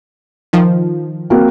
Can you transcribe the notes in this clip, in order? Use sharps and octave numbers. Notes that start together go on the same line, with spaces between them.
D#3 F3
A#3 C4 F#4